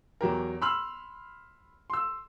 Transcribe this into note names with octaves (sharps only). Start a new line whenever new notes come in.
E2 F#3 G4 A#4
B5 C6 E6 F6 F#7
C6 E6